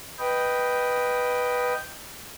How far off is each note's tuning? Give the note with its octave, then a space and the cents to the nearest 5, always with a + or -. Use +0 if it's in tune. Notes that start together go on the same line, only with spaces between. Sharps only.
B4 +0 D#5 +0 G5 +0